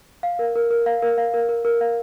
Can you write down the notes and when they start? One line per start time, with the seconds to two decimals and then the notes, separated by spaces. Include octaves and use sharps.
0.23 F5
0.39 A#4
0.55 A#4
0.71 A#4
0.86 F5
1.02 A#4
1.18 F5
1.34 A#4
1.49 A#4
1.65 A#4
1.81 F5